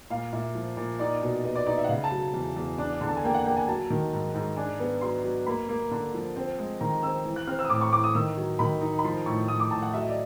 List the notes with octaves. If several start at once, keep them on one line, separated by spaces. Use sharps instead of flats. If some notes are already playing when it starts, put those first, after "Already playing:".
A#2 F5
A#2 E5
F3
A#2
D#4 D5
B2
B3 D#5
D5
D#4 D5
E5
F#5
C#3 F5
A5
F#3
E2
E2
D4
D3
A5
G#5
A#3 G5
F#5
A#3 G5
G#5
F#3 A5
D#3
G#2
G#2
D4 G#5
B3
F#3 C6
F#3
A#3 B5
A#3
D3
F3
C4
G#3
D#3 A#5
C4 E6
E3
F#6
C4 F6
E6
D#6
A2 D6
C#6
E3 D6
D#6
D#3 E6
F#3
D#3 B5
D#4
B5
F3 C6
A2 C#6
A2 D#6
D6
A2 A5
F#5
F#3 E5
D#5
D5